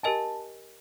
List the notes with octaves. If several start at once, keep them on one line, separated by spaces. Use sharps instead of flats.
G4 A#4 D#5 G#5 A5